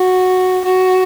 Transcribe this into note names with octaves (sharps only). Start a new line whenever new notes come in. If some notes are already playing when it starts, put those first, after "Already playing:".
Already playing: F#4
F#4